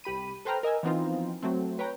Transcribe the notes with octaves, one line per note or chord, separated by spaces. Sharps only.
C2 G4 B5 D#7
A4 B4 C5 G5 A#5 F6
A#4 D#5 G#5 E6
E3 F3 B3 C4 D#4 F4
F#3 A3 C4
B4 C#5 G5 A#5